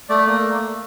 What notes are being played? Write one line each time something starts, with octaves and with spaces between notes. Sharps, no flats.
A3 D5
A#3